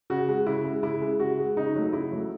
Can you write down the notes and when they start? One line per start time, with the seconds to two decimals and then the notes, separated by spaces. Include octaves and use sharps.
0.10 C#3 F#4
0.29 G#3
0.46 C#3 E4
0.65 G#3
0.83 C#3 E4
1.02 G#3
1.20 C#3 F#4
1.39 G#3
1.56 C#3 D#4
1.76 F#3 A3
1.93 C#3 E4
2.12 F#3 A3